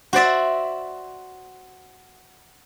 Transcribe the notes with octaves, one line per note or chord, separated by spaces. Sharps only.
F#4 C5 D5 E5